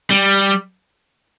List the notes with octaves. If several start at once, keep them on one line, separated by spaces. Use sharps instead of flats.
G3